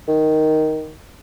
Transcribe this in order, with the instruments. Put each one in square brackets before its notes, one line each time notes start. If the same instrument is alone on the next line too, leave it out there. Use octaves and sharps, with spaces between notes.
[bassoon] D#3